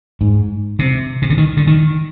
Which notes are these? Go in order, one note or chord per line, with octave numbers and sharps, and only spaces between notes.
G#2
C3
C3
D3
D#3
D3
D#3